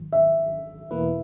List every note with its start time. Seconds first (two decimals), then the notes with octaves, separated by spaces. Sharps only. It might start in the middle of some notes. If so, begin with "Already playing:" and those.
Already playing: G#1 G#2 D#3 F#3
0.12 E5
0.91 E2 B2 A#3 E4 B4